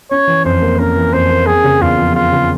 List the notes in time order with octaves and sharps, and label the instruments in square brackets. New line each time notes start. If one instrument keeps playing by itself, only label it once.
[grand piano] C#4 [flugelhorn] C#5
[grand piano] E3
[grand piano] F2 [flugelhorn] C5
[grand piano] A#3
[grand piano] C#4 [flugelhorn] A#4
[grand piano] E3
[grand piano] F2 [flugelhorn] C5
[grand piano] A#3
[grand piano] C4 [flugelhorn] G#4
[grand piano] C#3
[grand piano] E2 [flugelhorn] F4
[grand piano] F3
[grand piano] C4 [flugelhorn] F4
[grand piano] C#3